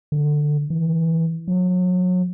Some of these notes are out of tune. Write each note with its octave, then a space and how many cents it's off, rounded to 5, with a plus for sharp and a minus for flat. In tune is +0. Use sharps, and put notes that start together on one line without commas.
D3 +15
E3 -10
F#3 -30